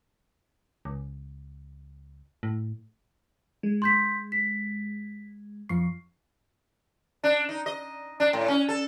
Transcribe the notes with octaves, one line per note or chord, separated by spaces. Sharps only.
C#2
A2
G#3
C6 G6 B6
B6
F2 F3 C#6 C7
D4
D#4
D#5
D4
A2
C#4
A4